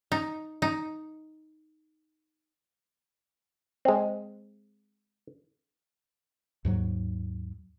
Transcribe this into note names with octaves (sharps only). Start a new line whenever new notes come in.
D#4
D#4
G#3 C4
D#2 G#2 F#3